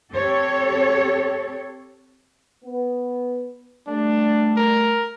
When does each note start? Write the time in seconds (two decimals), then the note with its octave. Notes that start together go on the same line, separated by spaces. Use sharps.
0.12 C4 G4 A4 C#5
2.63 B3
3.87 G3 A3 D4
4.57 A#4